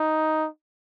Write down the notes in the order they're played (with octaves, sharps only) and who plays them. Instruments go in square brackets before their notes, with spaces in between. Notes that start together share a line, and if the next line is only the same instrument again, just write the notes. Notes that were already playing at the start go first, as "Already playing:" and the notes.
Already playing: [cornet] D#4